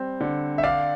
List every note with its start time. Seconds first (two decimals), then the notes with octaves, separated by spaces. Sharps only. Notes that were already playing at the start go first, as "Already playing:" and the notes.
Already playing: G3 C4
0.21 D3
0.58 E5
0.63 D4 D5 F5